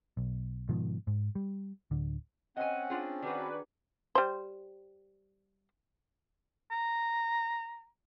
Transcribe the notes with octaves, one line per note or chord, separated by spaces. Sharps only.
B1
G#2 B2 D#3 F3
G#2
G3
D1 D3
C4 C#4 D#5 F#5 G#5
D4 F4 G#4
D#3 D4 F#4 G#4 B4 D5
G3 C5
A#5